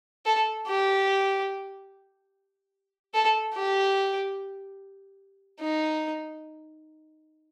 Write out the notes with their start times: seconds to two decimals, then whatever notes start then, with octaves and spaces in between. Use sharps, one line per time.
0.25 A4
0.67 G4
3.14 A4
3.55 G4
5.60 D#4